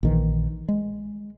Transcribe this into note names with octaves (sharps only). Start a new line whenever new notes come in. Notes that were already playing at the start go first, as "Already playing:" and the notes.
A#1 D#3 E3
G#3